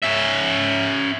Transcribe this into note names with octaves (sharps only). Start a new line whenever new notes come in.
C#4 E5